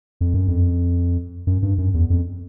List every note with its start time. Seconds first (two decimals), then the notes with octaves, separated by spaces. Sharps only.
0.21 F2
0.34 F#2
0.48 F2
1.47 F#2
1.62 G2
1.78 F#2
1.94 E2
2.10 F2